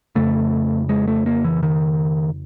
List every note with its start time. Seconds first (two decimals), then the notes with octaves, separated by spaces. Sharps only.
0.15 F2 C#3 A3
0.89 G#3
1.08 A3
1.26 A#3
1.44 E3
1.63 D#3